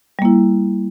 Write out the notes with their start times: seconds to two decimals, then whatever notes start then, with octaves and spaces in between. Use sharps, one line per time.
0.19 G3
0.22 A#3
0.25 E4